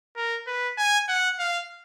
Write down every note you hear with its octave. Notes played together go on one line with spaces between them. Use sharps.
A#4
B4
G#5
F#5
F5